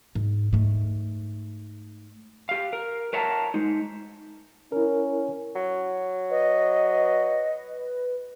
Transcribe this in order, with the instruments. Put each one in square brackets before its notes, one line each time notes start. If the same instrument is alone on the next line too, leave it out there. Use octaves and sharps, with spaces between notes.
[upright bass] G#2
G#2 A3
[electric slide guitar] G4 F5
A#4
A#4 C#5 E5 F#5 A5 A#5
G#3 D#4
[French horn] C#4 [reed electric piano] E4 A#4
[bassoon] F#3
[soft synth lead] B4 [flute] D#5